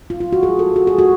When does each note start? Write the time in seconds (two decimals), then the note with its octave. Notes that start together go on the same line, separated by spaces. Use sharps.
0.10 F4
0.20 F4
0.33 F#4
0.43 G#4
0.59 A4
0.76 F#4
0.87 G#4
0.99 F#4